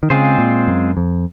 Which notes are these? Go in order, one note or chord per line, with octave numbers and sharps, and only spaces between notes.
D#3
C#3 G#3 C4 F4 G#4 C5
A#2
F#2
F2